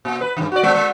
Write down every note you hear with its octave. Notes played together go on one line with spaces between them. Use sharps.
A#2
B4
G2 D3
F#4 D5
G#3 C4
G#3